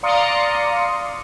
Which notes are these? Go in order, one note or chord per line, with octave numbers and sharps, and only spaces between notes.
D5 F5 A#5 C6 D#6 C#7